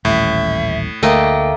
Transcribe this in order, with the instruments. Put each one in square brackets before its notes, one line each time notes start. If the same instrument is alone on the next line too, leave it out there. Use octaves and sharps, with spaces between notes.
[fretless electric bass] D#1 A1 [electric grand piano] A2 [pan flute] E5
[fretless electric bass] D2 [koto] A3 A#3 D#5 [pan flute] G5